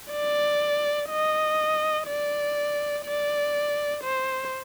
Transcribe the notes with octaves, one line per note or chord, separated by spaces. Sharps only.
D5
D#5
D5
D5
C5